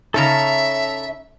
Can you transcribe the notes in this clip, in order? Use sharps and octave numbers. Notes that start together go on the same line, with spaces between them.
C#3 C#4 D#4 A4 E5 A5 A#5